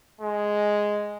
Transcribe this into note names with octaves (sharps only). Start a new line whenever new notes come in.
G#3